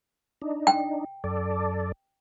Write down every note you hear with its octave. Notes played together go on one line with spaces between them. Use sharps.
D4 D#4
G5
F#2 A4 D5